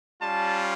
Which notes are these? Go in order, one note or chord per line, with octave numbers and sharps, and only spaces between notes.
G3 C#4 F4 A5